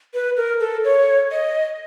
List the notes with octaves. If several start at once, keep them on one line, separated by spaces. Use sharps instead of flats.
B4
A#4
A4
C#5
D#5